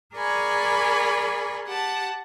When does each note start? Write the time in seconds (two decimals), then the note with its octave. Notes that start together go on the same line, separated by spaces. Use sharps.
0.15 G#4 A#4 D5 G#5 B5 C#6
1.65 G4 F#5 A5